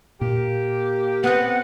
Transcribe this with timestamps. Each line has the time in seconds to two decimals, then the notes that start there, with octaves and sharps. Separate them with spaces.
0.21 A#2 A#3 G4
1.24 B3 C4 F#5